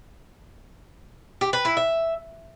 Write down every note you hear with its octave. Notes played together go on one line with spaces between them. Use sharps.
G4
B4
E4
E5